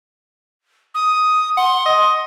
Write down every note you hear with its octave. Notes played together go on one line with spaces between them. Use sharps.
D#6
F#5 C6
D#5